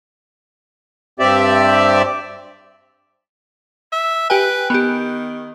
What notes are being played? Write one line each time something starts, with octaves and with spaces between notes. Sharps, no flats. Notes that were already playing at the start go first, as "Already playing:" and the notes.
G2 C4 G4 D5 E5
E5
G4 B4 G5 G#5
D#3 B3 G4